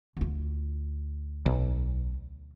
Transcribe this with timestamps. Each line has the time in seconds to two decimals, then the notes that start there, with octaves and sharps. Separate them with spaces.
0.17 D2 F4
1.46 B1